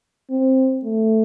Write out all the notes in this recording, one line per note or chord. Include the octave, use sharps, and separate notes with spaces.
C4
A3